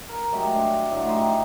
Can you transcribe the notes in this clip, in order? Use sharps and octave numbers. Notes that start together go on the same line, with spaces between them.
A#4
F#3 G#3 A3 G4
D4 C6
A2 D3
D#4 G4 C6